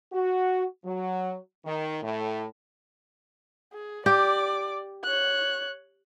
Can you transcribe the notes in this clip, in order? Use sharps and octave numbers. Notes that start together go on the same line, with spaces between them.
F#4
F#3
D#3
A2
G#4
G4 D5 D6
C#5 F#6